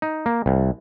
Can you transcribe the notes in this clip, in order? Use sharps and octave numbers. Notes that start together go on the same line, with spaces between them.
D#4
A#3
C2